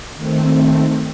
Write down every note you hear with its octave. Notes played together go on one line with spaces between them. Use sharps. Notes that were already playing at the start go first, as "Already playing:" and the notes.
D#3 A3 C4